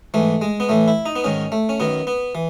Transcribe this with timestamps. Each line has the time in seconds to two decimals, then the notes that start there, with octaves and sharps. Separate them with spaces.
0.14 G#2 E3 A3
0.42 G#3
0.60 B3
0.69 A2 E3 A3
0.88 E4
1.06 D#4
1.16 B3
1.24 G#2 D#3 C#4
1.52 A3
1.69 C#4
1.80 F#2 D#3 B3
2.07 B3
2.35 E3